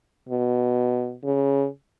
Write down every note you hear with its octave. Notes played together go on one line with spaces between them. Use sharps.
B2
C#3